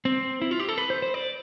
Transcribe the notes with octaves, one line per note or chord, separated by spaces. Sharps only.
C4
E4
F4
G4
A4
B4
C5
C5
D5